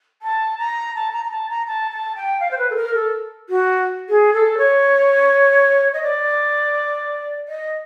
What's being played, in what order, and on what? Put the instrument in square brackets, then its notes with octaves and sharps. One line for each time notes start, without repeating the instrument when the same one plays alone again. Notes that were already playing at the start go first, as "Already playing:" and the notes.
[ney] A5
A#5
A5
A#5
A#5
A5
A#5
A5
A5
G5
F5
C5
B4
A4
A#4
A4
F#4
G#4
A4
C#5
D#5
D5
D#5